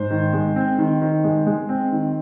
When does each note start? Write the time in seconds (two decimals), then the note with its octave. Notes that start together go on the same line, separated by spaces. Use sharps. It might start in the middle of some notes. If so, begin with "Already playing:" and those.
Already playing: G#2 C5
0.10 D#3
0.33 G#3
0.56 C4
0.78 D#3
1.01 D#3
1.24 G#3
1.47 G#3
1.69 C4
1.92 D#3